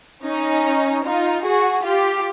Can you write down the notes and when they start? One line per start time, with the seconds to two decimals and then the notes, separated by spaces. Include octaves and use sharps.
0.24 C#4 D#4
1.05 D#4 F4
1.45 F#4 G#4
1.85 F4 G4